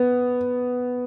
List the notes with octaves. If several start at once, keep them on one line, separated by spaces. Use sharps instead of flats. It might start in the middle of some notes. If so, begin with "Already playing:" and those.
Already playing: B3